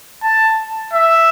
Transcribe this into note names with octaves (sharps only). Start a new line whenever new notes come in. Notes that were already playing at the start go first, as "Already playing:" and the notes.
A5
E5